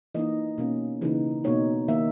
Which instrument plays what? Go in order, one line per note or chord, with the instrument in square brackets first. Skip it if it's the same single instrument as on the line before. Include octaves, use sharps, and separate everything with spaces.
[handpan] E3 A#3 D#4 D#5
B2 A#3 C#4
C#3 E3 A#3 D#4
B2 A#3 D#4 C#5
D#3 A#3 D#4 E5